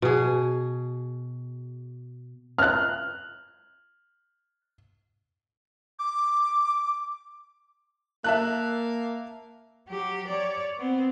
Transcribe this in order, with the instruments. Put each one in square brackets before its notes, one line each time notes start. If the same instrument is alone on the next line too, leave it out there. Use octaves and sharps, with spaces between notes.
[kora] B2 G#4
[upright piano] F6 F#6
[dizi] D6
[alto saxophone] A#3 [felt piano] E5 A5 F#6
[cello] F#3 G4
C#5 D5
B3 C4